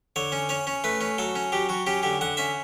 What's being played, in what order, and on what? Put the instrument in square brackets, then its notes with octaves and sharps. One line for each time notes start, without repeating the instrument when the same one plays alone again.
[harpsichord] D3 C#5
C#4
C#4 C#5
C#4
A3 B4
C#4
F#3 A4
C#4
F#3 G4
F#3 F#4
C#4 G4
D3 G4
D3 F#5
C#4 E5